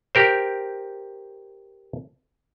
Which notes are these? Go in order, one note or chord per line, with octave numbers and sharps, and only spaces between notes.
G4 A#4 C5